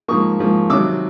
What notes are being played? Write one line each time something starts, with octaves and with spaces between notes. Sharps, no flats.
G#2 F3 A#3 C#6 D#6
G#2 F3 A#3
C3 D#3 F#3 D6 E6